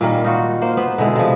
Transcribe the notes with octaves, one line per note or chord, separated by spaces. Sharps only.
A#2 D#3 G3 A#3
D#4 F4 F#4
A#3 C5
B3 B4 C5
B2 D3 G#3 E4
C3 F3